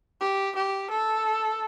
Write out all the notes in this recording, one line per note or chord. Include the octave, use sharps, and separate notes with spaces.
G4
G4
A4